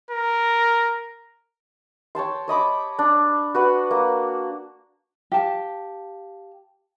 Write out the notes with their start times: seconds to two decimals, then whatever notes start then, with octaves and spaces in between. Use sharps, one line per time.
0.11 A#4
2.15 C#5 G5 A5 C6
2.48 C#5 D#5 B5 D6
2.99 D4
3.55 F#4 B4 F#5
3.91 A#3
5.32 G4 F5 A5